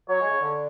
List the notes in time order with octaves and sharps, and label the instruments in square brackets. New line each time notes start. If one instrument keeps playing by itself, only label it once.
[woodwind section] F#3 [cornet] C#5
[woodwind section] G#3
C#3
D3